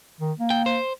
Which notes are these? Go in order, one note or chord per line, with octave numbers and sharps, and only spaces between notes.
D#3
A#3
G5
C5